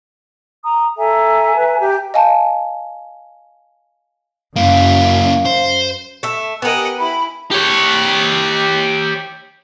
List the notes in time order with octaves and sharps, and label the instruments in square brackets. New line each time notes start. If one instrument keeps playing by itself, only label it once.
[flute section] A#5 D#6
[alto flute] A4 [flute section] E5 G#5 A#5
[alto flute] B4
G4
[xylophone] D#5 F5 G#5 A5
[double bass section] F#2 [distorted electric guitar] A#3 E4 [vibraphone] F5
[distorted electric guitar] C5
[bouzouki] A3 E5
[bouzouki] B3 G4 [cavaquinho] A#4 G#5 [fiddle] D#5 F#5
[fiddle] E4 [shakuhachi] B5
[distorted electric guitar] G4 C#5